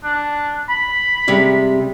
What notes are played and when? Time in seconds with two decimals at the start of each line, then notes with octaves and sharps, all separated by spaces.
0.04 D4
0.69 B5
1.27 C3 G3 G#3